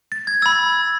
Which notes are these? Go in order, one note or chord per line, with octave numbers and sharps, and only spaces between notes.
A6
G#6
B5 E6 A6